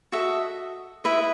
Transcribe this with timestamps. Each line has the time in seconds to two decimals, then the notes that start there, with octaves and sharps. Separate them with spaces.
0.12 F#4 A4 D#5 E5
1.04 E4 B4 D#5 E5